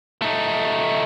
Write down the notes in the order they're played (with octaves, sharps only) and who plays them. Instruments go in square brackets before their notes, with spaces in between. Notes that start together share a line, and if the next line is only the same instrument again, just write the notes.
[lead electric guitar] A3 D#4